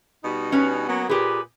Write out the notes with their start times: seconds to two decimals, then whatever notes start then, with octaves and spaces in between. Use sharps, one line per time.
0.23 B2 G3 D#4
0.52 C#4 B4 C#5
0.88 F#3 A#3 B3
1.09 A#2 G4 G#4 B4